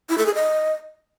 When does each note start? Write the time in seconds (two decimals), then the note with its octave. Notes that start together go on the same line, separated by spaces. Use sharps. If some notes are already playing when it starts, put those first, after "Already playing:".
0.09 E4
0.18 A4
0.26 G#4
0.34 D#5